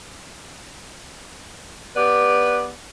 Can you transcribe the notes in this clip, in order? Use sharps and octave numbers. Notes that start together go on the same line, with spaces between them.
B3 G4 B4 D5